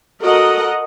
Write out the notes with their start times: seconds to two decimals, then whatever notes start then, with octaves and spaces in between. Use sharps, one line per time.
0.21 F#4 A4 A#4 D#5 F#5